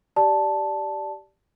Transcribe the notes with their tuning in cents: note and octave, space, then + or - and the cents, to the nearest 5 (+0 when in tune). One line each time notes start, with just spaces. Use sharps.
G4 -15 D5 +0 A5 +0